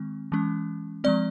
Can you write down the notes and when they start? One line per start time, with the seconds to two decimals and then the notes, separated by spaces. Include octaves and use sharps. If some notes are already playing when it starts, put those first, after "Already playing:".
Already playing: D#3 G#3 C4
0.32 E3 G#3 C#4
1.04 F3 G#3 C4 D5